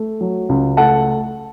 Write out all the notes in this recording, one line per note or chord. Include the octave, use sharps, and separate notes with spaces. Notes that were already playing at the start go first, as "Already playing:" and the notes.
Already playing: A3
F#3
C#2
A3 F#5 A5